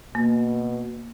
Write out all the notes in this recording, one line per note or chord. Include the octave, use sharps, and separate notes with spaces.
B2 A#3